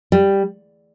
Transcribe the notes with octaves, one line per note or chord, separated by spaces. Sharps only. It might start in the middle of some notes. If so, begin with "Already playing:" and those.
G3